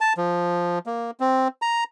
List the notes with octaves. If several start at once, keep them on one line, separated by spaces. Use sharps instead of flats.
A5
F3
A#3
C4
A#5